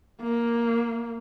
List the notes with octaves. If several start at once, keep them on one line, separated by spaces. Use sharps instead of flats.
A#3